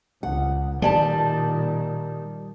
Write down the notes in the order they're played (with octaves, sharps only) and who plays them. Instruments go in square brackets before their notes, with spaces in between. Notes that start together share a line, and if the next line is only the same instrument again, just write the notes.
[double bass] C#2 [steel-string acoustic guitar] F#5
[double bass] A#2 D#3 [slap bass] G3 [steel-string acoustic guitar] D5 G#5 A5